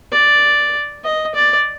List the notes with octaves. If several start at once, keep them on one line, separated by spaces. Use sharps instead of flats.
D5
D#5
D5